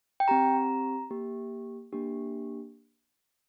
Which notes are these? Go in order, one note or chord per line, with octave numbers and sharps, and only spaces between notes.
G5
C4 G4 A#5
A#3 G4
A#3 D4 G4